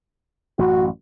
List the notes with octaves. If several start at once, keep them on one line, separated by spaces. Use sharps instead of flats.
A1 F#2 F#4